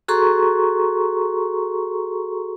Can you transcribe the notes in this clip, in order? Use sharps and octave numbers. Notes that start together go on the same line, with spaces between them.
F#4 G#4 A4 A#5 C6 C#6